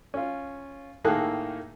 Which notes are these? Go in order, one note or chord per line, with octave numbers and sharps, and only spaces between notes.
C#4 F4
A2 D#3 A#3 G#4 A4 F#6